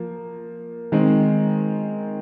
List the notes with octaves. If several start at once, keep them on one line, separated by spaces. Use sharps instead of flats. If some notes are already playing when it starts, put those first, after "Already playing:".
Already playing: F3 A#3
D#3 G#3 C4